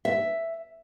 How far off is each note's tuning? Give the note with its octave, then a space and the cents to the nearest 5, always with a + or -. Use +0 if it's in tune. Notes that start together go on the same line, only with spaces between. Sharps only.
E5 +5